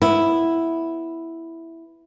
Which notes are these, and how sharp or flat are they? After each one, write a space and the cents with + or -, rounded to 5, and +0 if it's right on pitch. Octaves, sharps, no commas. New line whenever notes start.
B3 +0 E4 +0